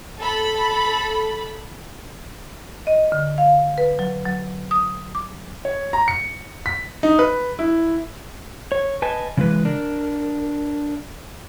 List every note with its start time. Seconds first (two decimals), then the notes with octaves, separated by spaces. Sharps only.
0.19 A4 B5
2.87 D#5
3.12 D3
3.38 F5
3.78 B4
3.99 F#3
4.25 F#3
4.71 D#6
5.15 D6
5.65 C#5
5.93 A#5
6.08 C#7
6.66 B6
7.03 D#4
7.19 B4
7.59 E4
8.72 C#5
9.02 B4 D#5 G#5 A5
9.37 C#3 E3 G#3 B4
9.65 D4 A#4